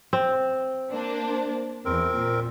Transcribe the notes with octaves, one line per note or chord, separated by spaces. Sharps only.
C4
A#3 D4 C5
E2 C4 A#4
A#2